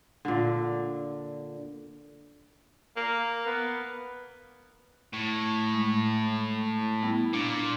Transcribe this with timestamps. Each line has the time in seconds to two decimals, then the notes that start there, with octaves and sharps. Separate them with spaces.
0.25 A#2 D3
2.97 A#3
3.46 B3
5.13 A2
5.74 G#3
7.03 G3 B3 E4
7.33 A#2 D4 D6